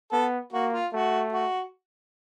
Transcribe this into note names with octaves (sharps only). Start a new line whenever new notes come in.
B3 A4
A#3 F#4
F4
A3 F#4
F#4